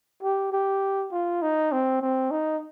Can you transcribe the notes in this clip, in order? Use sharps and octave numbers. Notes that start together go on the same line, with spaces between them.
G4
G4
F4
D#4
C4
C4
D#4